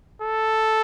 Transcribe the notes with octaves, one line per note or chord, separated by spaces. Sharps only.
A4